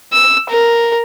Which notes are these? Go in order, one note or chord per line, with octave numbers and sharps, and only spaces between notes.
E6
A#4